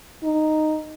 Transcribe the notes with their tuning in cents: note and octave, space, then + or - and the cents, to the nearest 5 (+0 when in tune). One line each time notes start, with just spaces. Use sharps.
D#4 -5